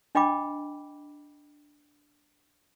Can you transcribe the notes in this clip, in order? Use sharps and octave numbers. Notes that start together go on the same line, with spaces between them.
D4 D#5 G5 B5 D6